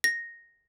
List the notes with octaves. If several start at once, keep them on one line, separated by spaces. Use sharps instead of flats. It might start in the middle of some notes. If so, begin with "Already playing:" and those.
A#6